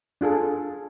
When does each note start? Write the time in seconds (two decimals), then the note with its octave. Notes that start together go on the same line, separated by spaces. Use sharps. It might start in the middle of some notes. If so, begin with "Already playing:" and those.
0.21 D4 F4 G#4 A4